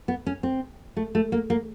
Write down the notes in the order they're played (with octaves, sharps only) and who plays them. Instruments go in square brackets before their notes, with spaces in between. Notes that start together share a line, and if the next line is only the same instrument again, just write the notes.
[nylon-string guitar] B3
C#4
C4
A3
A3
A#3
A#3